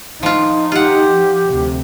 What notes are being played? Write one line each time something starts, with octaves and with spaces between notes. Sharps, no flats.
F3 D#4 F4
F4 G4 F#5
F3
D2 C3